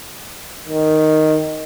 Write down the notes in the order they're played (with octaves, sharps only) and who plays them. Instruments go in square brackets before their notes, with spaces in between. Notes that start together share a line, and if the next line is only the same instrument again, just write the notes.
[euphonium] D#3